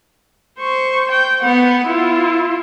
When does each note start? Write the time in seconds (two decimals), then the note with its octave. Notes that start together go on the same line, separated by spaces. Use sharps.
0.59 C5 C#6
1.11 G5
1.43 B3 F#5
1.87 E4 F4